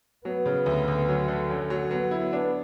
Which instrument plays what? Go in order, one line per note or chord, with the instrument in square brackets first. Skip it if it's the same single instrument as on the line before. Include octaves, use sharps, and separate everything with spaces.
[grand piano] F#3 [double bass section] B3
[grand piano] C#3
D2
D2
F#3
D3
F#2
F#3
[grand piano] F#3 [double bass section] B3
[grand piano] E4
[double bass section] B3 [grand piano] D4